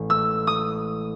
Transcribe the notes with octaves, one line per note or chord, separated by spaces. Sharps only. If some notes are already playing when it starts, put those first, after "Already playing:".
Already playing: A1 G#3
E6
D#6